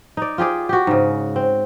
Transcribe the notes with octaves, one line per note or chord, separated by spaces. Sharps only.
D#4 D5
F4 G4 G#4 D5
F#4 G4
G#2 C#3
C4